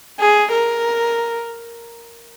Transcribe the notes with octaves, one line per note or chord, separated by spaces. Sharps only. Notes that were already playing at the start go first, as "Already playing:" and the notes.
G#4
A#4